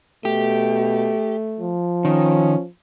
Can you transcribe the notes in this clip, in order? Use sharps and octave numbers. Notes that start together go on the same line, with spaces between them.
B2 A3 G4
F3
D#3 C#4